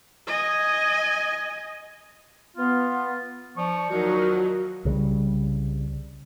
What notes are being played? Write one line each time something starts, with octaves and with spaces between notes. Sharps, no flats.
D#5 G#5
B3 F4
F3 D4 D5 C#6
D#2 F3 F#3 D#4 F#4 A#4
C2 C#3 F#3 G3